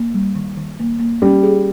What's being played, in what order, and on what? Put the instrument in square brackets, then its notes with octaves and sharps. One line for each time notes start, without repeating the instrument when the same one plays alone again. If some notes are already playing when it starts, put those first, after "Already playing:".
Already playing: [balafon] A#3
G3
D#3
D#3
A#3
A#3
[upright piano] G3 [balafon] C#4
[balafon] G#4